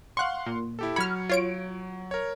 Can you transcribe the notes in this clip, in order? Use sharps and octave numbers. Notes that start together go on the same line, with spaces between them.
F5 F#5 C6 C#6 F#6
A#2
E4 G4 A4
F#3 B5 F6 G#6 C#7
F4 C#5 D7
A#4 C#5